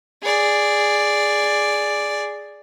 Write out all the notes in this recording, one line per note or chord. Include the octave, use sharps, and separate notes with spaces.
G#4 D5